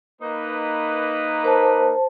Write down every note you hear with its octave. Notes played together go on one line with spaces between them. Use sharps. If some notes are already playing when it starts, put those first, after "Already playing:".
A#3 D#4 B4
A#4 C5 A5